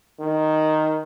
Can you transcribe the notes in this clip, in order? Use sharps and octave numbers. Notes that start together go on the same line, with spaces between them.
D#3